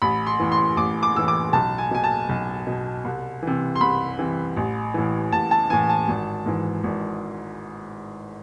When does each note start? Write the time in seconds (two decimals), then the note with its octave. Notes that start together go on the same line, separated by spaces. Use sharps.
0.02 A1 B5
0.27 C6
0.40 A2 E3
0.52 C6
0.77 A1 D6
1.03 D6
1.15 A2 E3 E6
1.28 D6
1.53 B1 A5
1.78 G#5
1.91 B2 G#5
2.04 A5
2.29 B1
2.67 B2
3.05 C2
3.42 C3 E3
3.76 C6
3.81 C2 B5
4.19 C3 E3
4.57 A1
4.94 A2 E3
5.32 A1 A5
5.51 A5
5.70 A2 E3 G#5
5.89 A5
6.08 G#1
6.46 G#2 E3
6.84 G#1